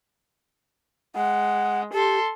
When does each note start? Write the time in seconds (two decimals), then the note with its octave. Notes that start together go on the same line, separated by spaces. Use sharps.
1.16 G#3 F#5
1.93 G4 A4 C6